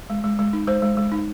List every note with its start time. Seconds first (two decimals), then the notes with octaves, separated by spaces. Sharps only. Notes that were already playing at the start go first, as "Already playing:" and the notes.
0.10 G#3
0.24 G#3
0.39 G#3
0.53 D#4
0.67 G#3 C5
0.82 G#3
0.97 G#3
1.12 D#4